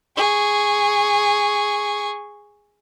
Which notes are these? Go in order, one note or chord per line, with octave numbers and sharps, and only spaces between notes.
G#4 C#6